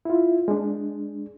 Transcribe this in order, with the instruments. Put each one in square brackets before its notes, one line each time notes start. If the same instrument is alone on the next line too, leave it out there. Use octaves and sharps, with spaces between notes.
[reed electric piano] E4 F4
G#3 D4